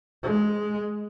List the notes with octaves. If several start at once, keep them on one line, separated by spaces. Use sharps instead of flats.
G#3